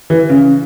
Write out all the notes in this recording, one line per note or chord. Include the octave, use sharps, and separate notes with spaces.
E3
C#3